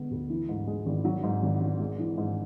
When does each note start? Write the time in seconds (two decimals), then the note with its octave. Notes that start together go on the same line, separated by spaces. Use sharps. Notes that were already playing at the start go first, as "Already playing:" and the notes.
Already playing: D3 G#3 B3
0.11 D2
0.30 E3
0.49 G#2
0.67 G#3
0.86 G#1
1.05 F#3
1.23 G#2
1.42 G#1
1.61 G#1
1.80 G#3
1.99 E3
2.18 G#2